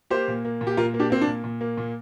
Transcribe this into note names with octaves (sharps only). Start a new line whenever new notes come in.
A#3 G4 C5
A#2
A#3
A#2
G4
A#2 F4 A#4
A#3
D4 G4
A#3 C4
D4
A#2
A#2
A#3
A#2